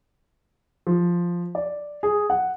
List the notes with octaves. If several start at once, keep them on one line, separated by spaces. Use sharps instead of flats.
F3
D5
G#4
F#5